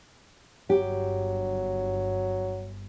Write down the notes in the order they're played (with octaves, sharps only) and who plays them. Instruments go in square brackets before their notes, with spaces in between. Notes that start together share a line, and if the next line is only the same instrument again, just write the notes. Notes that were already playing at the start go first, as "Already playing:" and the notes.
[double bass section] G1 [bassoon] F#3 [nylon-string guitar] G4